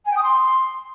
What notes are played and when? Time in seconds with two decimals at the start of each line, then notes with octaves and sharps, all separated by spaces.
0.06 G#5
0.12 G5
0.18 D#6
0.23 C6